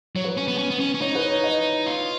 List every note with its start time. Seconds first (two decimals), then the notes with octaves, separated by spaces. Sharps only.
0.16 F#3 C#5
0.24 B4
0.32 C#5
0.37 C#4
0.48 B3
0.58 C#4
0.70 B3
0.80 C#4
0.94 C#4
1.01 D#4 C#5
1.15 B4
1.30 C#5
1.43 D#5
1.87 F4